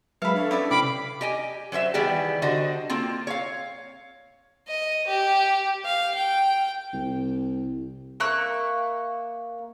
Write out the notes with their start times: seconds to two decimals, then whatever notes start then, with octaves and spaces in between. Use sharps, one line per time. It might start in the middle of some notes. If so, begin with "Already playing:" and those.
0.22 F#3 G#3 B4 E5 F5 B5 C#7
0.34 D4 A4 C#5
0.51 C#4 E4 D5 E5
0.71 C3 F5 G5 B5 D6
1.21 G4 D#5 G#5
1.72 F#3 C5 C#5 E5
1.94 D#3 E3 G3 B3 G4 G#4
2.42 D3 F#4 C5 D#5
2.90 A#3 C4 F4
3.27 C#5 F5
4.68 D#5
5.07 G4
5.85 F5
6.15 G5
6.93 C2
8.20 A#3 E5 C#6 F#6